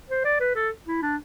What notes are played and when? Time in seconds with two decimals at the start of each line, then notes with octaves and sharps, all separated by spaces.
0.10 C5
0.25 D5
0.40 B4
0.55 A4
0.86 E4
1.02 D4